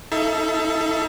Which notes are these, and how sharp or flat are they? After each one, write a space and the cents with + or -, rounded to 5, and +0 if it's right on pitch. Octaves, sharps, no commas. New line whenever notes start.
D#4 +40 A4 +0 E5 +40